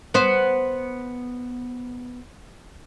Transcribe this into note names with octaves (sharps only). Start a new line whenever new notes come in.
B3 C5